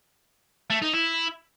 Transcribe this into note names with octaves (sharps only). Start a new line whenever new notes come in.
A3
D#4
E4